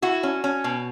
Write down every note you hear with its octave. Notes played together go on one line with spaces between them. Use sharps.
E4 F#4
C#4
C#4
B2